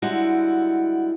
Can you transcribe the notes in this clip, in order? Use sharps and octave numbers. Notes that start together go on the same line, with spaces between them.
D3 G3 G#3 E4 F#4